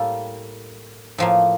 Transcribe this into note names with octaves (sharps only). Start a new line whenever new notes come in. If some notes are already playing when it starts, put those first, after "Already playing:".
Already playing: A2 G3 A#3 A4
A2 F3 A#3